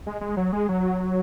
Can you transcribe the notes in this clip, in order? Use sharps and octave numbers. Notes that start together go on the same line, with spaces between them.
G#3
G#3
F#3
G#3
F#3